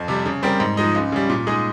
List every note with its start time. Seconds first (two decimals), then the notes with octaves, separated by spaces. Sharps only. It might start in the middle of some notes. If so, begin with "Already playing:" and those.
Already playing: F2
0.08 C3 G3
0.26 C#3
0.43 G3 C4 G4 A#4
0.60 G#2
0.77 F3 G#3 D#4
0.95 C#2
1.12 C#3 G3
1.30 A#2
1.47 G#3 D#4 G#4